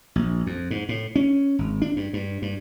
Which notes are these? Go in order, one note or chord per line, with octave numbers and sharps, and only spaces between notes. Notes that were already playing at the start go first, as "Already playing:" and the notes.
A#1
F2
G#2
A2
C#4
G#1
D4
G2
G2
G2